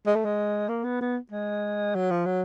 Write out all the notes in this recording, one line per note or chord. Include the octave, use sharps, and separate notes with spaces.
G#3
A3
G#3
A#3
B3
B3
G#3
F#3
F3
F#3